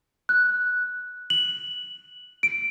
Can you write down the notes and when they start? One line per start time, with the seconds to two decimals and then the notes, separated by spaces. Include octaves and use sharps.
0.29 F#6
1.30 F#7
2.43 D7